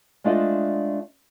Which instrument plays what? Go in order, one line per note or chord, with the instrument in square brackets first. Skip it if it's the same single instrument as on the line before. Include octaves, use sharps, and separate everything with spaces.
[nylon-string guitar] G#3 A3 D4 F4 D5 D#5